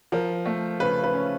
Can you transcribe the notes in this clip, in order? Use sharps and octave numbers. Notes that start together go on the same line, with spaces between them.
F3 A#4
A3
C#3 B4
B4
C#4